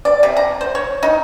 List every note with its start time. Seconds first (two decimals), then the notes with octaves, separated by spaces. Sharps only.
0.05 D5
0.23 C3
0.37 A#5
0.61 C5
0.75 C#5
1.03 D#4